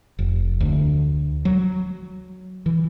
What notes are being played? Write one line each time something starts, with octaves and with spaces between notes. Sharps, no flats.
F1
D2
F#3
E3